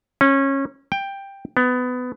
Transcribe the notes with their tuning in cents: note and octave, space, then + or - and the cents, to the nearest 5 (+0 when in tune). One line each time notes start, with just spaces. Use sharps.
C#4 -20
G5 +10
B3 +20